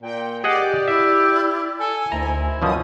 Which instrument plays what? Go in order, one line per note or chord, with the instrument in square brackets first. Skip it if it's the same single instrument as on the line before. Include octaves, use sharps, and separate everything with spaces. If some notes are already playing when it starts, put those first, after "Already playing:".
[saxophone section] A#2 [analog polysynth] G5
[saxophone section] G4 [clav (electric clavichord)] G#4 D#5 F#5 [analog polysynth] D5
[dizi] E4 [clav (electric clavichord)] E5
[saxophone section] A4 [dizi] G#5
[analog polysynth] D2 [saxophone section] D#3 C4 E4 [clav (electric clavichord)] A#5
[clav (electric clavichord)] F#2 B2 F3 [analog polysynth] D#6